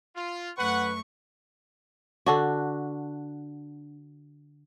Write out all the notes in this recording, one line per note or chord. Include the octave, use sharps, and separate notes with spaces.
F4
F#2 A3 B4 F#5 C#6
D3 D4 F#4